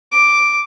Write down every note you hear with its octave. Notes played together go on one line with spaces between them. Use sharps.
D6